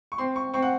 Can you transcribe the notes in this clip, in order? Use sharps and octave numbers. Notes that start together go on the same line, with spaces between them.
C#6
C4 C6
C#6
C4 C#6
F#5